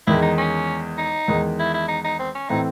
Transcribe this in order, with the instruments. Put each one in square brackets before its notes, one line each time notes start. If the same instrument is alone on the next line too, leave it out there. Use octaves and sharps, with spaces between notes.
[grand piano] E2 D#3 G#3 [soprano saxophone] E4
[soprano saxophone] D#4
C#4
D#4
[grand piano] E2 D#3 G#3
[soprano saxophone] E4
E4
D#4
D#4
C4
C#4
[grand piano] A2 E3 C4 [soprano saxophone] D#4